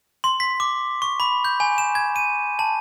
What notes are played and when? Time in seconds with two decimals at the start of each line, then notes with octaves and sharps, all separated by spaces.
0.24 C6
0.40 B6
0.60 D6
1.02 C#6
1.20 B5
1.45 G6
1.60 G#5
1.78 E7
1.95 G#6
2.16 D#7
2.59 A5